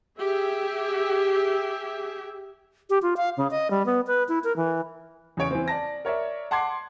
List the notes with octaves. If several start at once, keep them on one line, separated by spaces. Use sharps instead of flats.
G4 G#4 E5
G4
F4
F5
C#3
D#5
G3
B3
B4
E4
A#4
E3
E2 C#3 C#5 D7
E3 C4
D5 A5 A#6
A#4 C#5 D5 E5
F#5 A5 C6 D6 G#6 C7